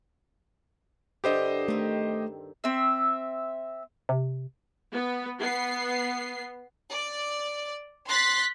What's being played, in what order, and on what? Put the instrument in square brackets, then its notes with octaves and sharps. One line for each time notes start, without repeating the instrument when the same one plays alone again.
[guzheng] G2 D3 E4 [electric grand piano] G4 C5 D#5
[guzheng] D#3 C4 [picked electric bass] A3
[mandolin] C4 E5
[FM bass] C3
[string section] B3
B3 C7
D5
C6 F#6 A6 B6